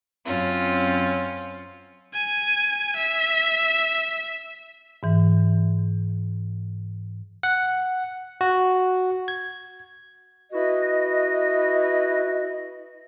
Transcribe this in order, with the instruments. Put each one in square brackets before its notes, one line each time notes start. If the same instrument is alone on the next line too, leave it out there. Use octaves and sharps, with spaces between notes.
[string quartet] F#2 C4 C#4 F4
[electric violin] G#5
E5
[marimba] G#2 E3
[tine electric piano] F#5
F#4
G#6
[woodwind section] E4 F#4 B4 D#5